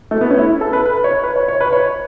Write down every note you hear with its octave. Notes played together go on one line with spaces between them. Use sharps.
A3
B3
C#4
E4
A4
B4
B4
C#5
B4
C#5
C#5
B4
C#5